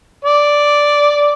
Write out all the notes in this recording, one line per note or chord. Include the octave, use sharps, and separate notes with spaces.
D5